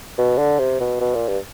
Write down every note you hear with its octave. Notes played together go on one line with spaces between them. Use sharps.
B2
D3
C3
B2
B2
A#2
G2